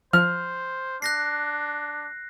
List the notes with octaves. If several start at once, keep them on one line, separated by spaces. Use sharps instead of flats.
F3 C5 F6
D4 F#6 A#6 C7